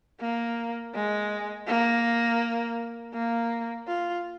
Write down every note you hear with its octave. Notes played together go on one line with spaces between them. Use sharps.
A#3
G#3
A#3
A#3
F4